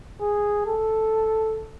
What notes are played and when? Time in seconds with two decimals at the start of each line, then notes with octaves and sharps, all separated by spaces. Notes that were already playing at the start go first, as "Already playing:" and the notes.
0.21 G#4
0.66 A4